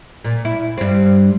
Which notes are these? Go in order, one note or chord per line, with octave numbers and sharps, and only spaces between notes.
A#2
E4
G2 C4